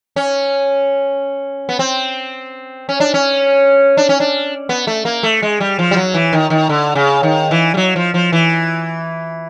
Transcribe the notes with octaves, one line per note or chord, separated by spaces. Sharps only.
C#4
B3
C4
C#4
D4
C#4
D4
C#4
D4
B3
A3
A#3
A3
G#3
G3
F3
G3
F#3
E3
D#3
D#3
D3
C#3
D#3
E3
G3
F#3
F3
F3
E3